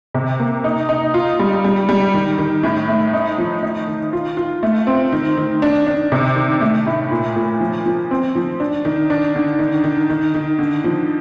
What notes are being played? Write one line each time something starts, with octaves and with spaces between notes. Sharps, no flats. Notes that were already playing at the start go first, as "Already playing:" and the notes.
C3
A#3
D#4
D#4
F4
G3
G3
G3
D#3
D#3
A2
A3
D#4
F3
D#4
D#3
F4
F4
A3
C4
D#3
D#3
D4
D4
C3
D#3
A3
A2
A#2
A#2
F3
F3
C4
F3
D4
D#3
D4
D3
D#3
D#3
D#3
D#3
D3
F3